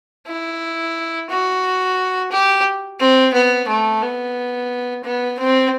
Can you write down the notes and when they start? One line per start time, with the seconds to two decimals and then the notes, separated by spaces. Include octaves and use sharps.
0.27 E4
1.30 F#4
2.31 G4
3.00 C4
3.33 B3
3.68 A3
4.02 B3
5.04 B3
5.39 C4